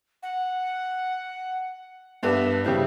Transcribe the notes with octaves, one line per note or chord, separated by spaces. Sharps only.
F#5
G2 B3 D4 E5
C#3 G3 E4 C5